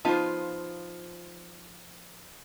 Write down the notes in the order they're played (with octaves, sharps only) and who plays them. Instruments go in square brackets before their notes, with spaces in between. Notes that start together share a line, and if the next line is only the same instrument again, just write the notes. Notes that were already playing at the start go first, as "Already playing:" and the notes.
[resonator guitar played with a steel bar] F3 C5 [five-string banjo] B3 D#4 F4